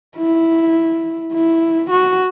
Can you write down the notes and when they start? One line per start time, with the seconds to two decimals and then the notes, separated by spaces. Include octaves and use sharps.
0.17 E4
1.33 E4
1.91 F#4